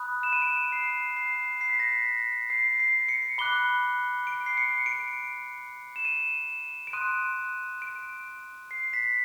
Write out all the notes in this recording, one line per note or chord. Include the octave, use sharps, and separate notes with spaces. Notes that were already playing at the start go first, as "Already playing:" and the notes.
Already playing: B5 D#6 F#6
E7
D#7
D7
C7
C7
C7
B6
A#6
B6
B6
C7
C7
C#7
B5 D6 F#6 G7
D7
C7
C#7
D7
E7
D#7
D7
C6 D#6 F#6 D#7
D7
C7
B6